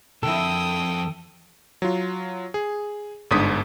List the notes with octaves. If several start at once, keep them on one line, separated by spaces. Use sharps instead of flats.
C2 F2 D3 A#3 E4 A4 G5 D#6
F#3 F4
G#4
G1 G#2 D4 D#6 B6